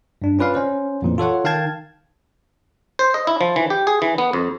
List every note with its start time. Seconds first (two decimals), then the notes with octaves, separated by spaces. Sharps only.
0.22 G2 D4
0.39 C#4 F4 B4 D5 F5
0.55 C#4 C5
1.02 F2 A#2 E3
1.18 F4 A4 C#5 F#5
1.44 D#3 F5 G5 A5 G#6
2.99 C5
3.14 D#5
3.27 E4
3.41 F3
3.56 E3
3.70 G4
3.87 G#4
4.02 E3
4.18 B3
4.33 F2